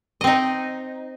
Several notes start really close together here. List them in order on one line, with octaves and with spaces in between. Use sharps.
D#5 C4 D#4